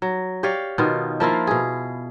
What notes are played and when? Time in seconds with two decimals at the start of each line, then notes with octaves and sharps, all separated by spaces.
0.02 F#3
0.43 G4 C#5 D5 F5
0.78 B2 D#3 B3 F4
1.20 F3 A#3 E4 F4
1.47 B2 G#4